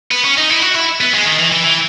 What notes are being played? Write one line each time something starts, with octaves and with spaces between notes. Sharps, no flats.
B3
C#4
D#4
E4
F#4
E4
B3
G#3
D#3
E3
E3
E3